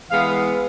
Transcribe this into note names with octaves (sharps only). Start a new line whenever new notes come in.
E3 G#3 B3 F5